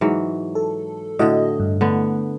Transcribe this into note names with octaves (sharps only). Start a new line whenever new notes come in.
G#2 E3 F#3
A4
A2 D3 F#4 D#5
G2
D3 A3 B3